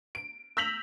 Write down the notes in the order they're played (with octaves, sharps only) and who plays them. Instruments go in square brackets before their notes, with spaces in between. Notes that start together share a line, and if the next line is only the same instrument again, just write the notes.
[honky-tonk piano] D7
E6 G6 A#6 B6 F7 F#7